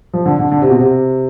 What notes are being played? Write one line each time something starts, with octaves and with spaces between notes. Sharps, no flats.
F3
D3
D3
D3
C3
B2
C3